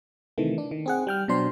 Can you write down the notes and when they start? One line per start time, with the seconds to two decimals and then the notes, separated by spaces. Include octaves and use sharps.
0.38 C3 D#3 E3 A3
0.58 D4
0.71 D#3
0.86 C4 G#4 F#5
1.07 G3 G5 F6
1.28 B2 F#3 D4 C5 C6